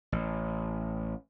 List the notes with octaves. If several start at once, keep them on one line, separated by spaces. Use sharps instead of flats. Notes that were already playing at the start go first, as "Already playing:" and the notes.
A1